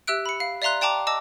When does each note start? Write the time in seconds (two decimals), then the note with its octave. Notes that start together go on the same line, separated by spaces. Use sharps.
0.07 G4 E5 E6 F#6 D7
0.26 B5 C#7
0.40 F5
0.62 D5 E5 F5 A#5 C6 F#6
0.81 D5 G5 A5 A#5 D6
1.07 D#5 A5 D6 E6